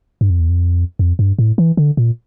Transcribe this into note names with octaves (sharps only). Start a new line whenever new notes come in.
G2
F2
E2
F2
F2
G2
A2
E3
D3
A#2